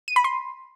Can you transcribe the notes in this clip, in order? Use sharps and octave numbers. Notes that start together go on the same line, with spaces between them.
D#7
B5
C6